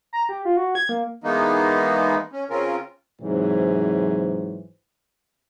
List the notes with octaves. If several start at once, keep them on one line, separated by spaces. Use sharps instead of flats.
A#5
G4
F4
F#4
G#6
A#3
E3 G#3 A#3 B3 D#4
C#4
C#3 C4 C#4 F4 A#4
G#2 C3 E3 F#3 C5